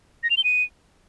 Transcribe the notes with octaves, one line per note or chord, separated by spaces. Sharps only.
A#6
F7
G7
D#7